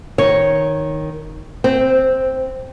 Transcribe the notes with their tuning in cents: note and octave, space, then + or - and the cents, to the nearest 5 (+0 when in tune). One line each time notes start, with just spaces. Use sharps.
D#3 +0 C#5 +0
C4 +0 C5 -20